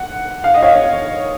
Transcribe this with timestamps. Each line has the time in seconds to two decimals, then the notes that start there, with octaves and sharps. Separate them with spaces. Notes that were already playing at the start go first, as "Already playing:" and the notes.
Already playing: F#5
0.44 F5
0.54 D#5
0.62 C#5 F5